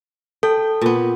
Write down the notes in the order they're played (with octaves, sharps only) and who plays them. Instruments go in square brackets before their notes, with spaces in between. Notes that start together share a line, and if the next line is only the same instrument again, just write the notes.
[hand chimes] A4 [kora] G5
[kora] A#2 B3